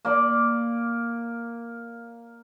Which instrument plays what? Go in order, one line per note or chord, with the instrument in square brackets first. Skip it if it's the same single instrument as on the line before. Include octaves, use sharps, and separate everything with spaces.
[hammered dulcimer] A#3 D5